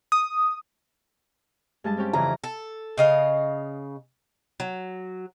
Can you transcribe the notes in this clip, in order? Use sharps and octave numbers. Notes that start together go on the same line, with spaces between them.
D#6
G2 G#3 A5
C4 C#4 G4
F2 C#3 E3 A#5
A4
C#3 D#5 F5
F#3